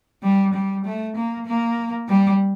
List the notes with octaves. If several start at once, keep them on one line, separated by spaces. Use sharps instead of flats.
G3
G3
A3
A#3
A#3
G3